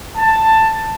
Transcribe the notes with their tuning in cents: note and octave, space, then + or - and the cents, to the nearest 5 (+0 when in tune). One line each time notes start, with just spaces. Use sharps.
A5 +10